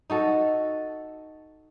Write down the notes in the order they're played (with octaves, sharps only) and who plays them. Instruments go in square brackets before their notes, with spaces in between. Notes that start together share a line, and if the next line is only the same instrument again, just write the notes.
[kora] D#4 F#4 A4